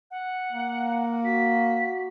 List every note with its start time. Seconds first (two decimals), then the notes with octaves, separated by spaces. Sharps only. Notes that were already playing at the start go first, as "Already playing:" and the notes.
0.11 F#5
0.52 A#3
1.25 F#4 B6